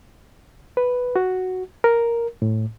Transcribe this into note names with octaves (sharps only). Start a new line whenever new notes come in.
B4
F#4
A#4
A2